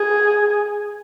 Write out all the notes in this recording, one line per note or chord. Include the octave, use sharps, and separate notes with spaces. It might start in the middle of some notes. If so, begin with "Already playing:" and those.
Already playing: G#4